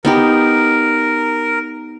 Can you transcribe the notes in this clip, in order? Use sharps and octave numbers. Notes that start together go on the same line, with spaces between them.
B3 D#4 G4 A#4